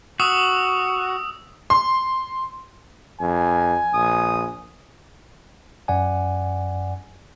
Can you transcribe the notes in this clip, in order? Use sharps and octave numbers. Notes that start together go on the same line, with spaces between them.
F#4 D#6 E6
C6
F2 G#5
A#1 D#6
F#2 D5 F#5 G#5